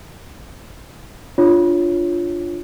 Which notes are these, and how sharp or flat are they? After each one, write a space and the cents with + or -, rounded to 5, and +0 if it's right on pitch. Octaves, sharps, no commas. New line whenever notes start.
D4 +10 F4 +0 C#5 +0